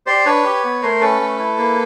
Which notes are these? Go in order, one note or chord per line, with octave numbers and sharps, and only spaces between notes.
G4 C5 D5
D4 B4 C#5
G4
B3
A3 A#4 C5
C#4 A4 B4
A3
E4
A#3